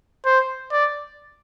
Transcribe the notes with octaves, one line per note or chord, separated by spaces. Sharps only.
C5
D5